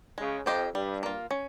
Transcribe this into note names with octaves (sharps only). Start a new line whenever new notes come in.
C#3 G#3
F2 C4 G4 C5 D#5
G2 G3
A#3 F4
C#4